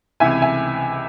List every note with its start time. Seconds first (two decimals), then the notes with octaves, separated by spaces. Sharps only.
0.20 C#2 C3 E3 E5 G#5
0.42 E5 G#5